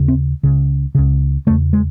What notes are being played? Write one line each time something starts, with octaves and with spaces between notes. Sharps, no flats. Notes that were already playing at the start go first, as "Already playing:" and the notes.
Already playing: D#2 C#3
C4
C#2 C#3
C#2 C#3
E2 C#3 A3
G#3